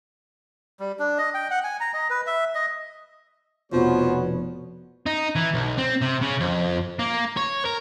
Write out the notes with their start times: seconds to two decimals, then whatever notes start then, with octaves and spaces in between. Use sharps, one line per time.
0.80 G3
0.99 D4
1.18 D#5
1.34 G5
1.51 F#5
1.64 G#5
1.80 A#5
1.94 D#5
2.10 B4
2.27 E5
2.55 D#5
3.72 F1 B2 F3 B3 F#4 B4 C#5
5.06 D#4
5.36 E3
5.54 B1
5.78 C4
6.02 C3
6.22 C#3
6.40 F2
6.99 A#3
7.37 C#5
7.65 A#4